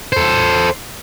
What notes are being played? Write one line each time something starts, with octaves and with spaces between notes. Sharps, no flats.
A4 C5